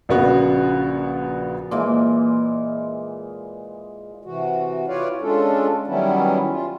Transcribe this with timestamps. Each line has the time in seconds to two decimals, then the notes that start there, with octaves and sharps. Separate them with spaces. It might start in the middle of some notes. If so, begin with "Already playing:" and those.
0.09 A#1 C#3 B3 F#4
1.71 A#2 E3 G#3
4.25 C3 E3 F#4
4.88 E4 F4 B4 C#5 D5 F5
5.21 G#3 C#4 D4 F4 A4
5.87 D#3 F#3 G3 B3 C#4 E4
6.50 F4